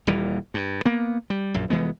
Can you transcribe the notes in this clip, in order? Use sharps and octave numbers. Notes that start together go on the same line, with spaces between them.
D#1 D#2 E3 G3
G2
A#3 B3
G3
A#1 F#2
F1 E3 G#3 B3